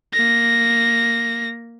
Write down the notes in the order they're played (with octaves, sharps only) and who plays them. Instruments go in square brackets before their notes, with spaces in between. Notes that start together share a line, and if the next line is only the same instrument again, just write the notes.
[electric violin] A#3 A#6